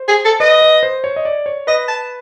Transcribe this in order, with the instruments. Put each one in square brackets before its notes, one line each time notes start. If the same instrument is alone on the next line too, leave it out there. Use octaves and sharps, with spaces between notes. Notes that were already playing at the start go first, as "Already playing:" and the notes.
Already playing: [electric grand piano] C5
[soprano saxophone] G#4
A4
[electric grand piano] B4 [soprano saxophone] D#5
[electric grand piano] B4
C5
C#5
D#5
D5
C#5
[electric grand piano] B4 [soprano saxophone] D#5
[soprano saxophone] A5